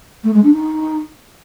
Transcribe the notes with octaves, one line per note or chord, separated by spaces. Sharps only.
A3
G#3
D4
D#4